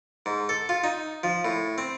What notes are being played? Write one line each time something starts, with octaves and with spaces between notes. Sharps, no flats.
G#2
A4
F4
D#4
F3
A2
C4